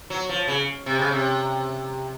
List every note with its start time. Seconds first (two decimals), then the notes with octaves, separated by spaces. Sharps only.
0.10 F#3
0.29 F3
0.48 C#3
0.86 C3
0.99 C#3
1.11 C3